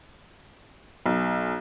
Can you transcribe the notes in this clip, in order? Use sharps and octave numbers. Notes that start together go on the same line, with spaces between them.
B1